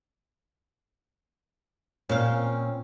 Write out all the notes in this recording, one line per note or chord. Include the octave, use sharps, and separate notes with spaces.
A#2 C4 C#4 F5